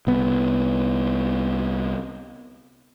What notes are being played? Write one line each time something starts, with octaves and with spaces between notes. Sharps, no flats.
C2 B3